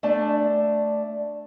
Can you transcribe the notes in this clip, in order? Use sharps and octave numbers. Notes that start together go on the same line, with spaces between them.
A3 D4 D5 A5